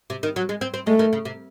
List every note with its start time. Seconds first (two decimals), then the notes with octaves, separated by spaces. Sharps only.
0.10 C3
0.23 D#3
0.36 F#3
0.49 G#3
0.61 C4
0.74 C4
0.87 G#3 A3
0.99 D#3
1.13 C#3
1.25 C3